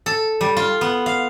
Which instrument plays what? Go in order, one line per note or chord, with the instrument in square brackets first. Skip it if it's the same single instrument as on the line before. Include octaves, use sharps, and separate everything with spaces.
[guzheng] A4
G3
F4
B3
F5